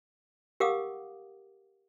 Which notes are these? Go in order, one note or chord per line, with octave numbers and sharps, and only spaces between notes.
G4 A#4 F5 F#5 D6 D#6